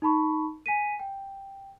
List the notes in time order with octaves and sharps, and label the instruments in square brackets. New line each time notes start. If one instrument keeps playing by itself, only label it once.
[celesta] D#4 A5 B5 C#6
G#5 B6 D#7
G5